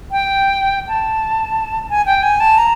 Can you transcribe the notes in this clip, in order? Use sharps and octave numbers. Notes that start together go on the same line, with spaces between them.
G5
A5
G#5
G5
G#5
A5
A#5